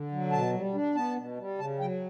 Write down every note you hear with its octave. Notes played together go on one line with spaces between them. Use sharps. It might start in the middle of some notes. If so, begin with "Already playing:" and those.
Already playing: D3
F#3
B2 A5
G3
D4
B3 A5
B2
G3
C#3 A5
F#3 G5